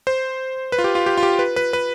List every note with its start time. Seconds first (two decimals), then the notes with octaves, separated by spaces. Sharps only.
0.07 C5
0.72 B4
0.78 F4
0.84 G4
0.95 F4
1.06 G4
1.17 F4
1.23 G4
1.39 B4
1.56 B4
1.73 B4